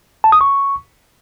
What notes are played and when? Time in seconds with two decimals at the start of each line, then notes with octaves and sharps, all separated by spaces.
0.24 A5
0.32 D#6
0.41 C#6